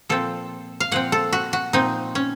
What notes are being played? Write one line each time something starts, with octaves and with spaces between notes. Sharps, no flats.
A#2 F3 C4 A4
F5
A#2 F3 C4 F#5
A4
F#4
F#4
A#2 F3 C4 D#4
C#4